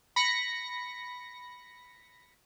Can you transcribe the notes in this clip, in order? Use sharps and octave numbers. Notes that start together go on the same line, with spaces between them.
B5 A#6 C#7